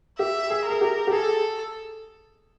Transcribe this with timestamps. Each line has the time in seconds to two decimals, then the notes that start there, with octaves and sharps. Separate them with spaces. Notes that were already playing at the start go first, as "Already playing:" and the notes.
0.19 G4 E5
0.50 G#4
0.65 G#4 A#4
0.81 G4
1.07 G4
1.12 G#4 A4